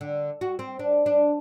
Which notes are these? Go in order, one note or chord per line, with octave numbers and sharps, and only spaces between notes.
D3
F#4
C4
D4
D4